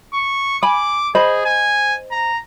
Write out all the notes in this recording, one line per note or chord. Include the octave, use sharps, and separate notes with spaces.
C#6
G#5 B5 D6
G#4 C5 D#5 B5
G#5
A#5